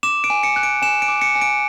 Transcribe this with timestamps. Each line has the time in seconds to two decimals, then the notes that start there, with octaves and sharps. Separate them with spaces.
0.03 D6 E7
0.24 D7
0.30 G#5
0.43 C#7
0.56 F#6
0.63 D7
0.82 G#5 E7
1.02 D7
1.08 D6
1.21 C#7
1.35 G#5
1.42 D7